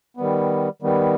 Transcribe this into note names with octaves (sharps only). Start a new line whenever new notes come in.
D#3 G3 B3
D#3 G3 B3